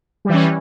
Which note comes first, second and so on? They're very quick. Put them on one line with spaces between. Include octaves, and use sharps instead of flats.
G3 E3 C#4